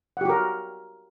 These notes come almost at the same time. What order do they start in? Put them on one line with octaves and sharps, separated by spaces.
F#5 G4 F#4 A#4